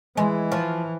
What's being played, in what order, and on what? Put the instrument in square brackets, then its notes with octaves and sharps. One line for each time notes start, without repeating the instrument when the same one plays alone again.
[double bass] E3 [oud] G#3
[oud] F3